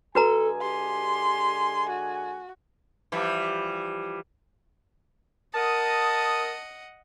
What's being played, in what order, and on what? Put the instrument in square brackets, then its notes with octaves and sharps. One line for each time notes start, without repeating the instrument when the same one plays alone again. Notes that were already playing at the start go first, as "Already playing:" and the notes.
[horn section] D3 G#3 G#5 [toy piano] F#4 B4 A#5 [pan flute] A4
[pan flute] G4 [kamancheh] C6
[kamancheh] F#4
[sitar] E3 F3 G3
[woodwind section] A#4 D#6 [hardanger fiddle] D#5 F#5 [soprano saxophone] A5